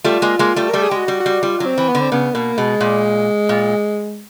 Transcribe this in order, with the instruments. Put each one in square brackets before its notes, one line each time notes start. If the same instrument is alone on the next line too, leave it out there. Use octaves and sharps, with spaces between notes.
[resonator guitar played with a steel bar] G3 A3 [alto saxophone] F4
[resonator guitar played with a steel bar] G#3 A#3
G#3 A#3
G3 A3
[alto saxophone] A#4
[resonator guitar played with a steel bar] G3 A3 [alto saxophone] A4
[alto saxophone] G#4
[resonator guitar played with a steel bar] G#3 [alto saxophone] G4
[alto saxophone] F#4
[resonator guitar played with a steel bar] G3
[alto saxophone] F#4
[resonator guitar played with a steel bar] G3
[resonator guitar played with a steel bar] G3 [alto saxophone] F4
[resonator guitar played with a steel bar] F#3
[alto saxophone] C4
[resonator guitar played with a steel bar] E3
[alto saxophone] B3
[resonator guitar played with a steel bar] D3
[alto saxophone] C4
[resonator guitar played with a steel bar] C#3 [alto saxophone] B3
[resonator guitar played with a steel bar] B2 [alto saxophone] A#3
[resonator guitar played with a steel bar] B2 [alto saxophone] G#3
[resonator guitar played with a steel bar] A#2
A#2